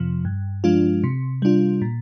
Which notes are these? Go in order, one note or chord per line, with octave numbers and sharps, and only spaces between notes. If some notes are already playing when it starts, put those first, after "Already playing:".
Already playing: F2 C3 F3
G2
F3 G#3 D4 F4
C3
G3 D4 F4
A#2